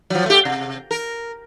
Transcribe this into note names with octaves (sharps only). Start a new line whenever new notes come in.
F3 F#3
A3 G4
C3
A#4